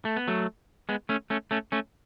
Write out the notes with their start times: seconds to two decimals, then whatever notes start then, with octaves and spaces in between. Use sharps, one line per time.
0.05 A3
0.16 B3
0.28 F#3 A3
0.89 G#3 B3
1.09 A3 C#4
1.30 A3 C#4
1.51 A3 C#4
1.72 A3 C#4